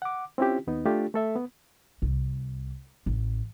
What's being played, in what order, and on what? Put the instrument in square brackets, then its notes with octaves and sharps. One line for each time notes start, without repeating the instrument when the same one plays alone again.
[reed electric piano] F#5 D6
C4 C#4 E4 F4 G4
D#2 B3 D#4
A3 D4 F4 G4
A3 A4 E5
B3
[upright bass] C2
A1